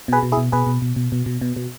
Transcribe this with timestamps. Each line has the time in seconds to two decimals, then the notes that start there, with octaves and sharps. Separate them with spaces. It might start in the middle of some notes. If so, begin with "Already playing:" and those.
0.08 B2 G#4 B4
0.23 B2
0.32 E4 G#4
0.37 B2
0.52 B2 G#4 B4
0.67 B2
0.82 B2
0.96 B2
1.12 B2
1.26 B2
1.41 B2
1.56 B2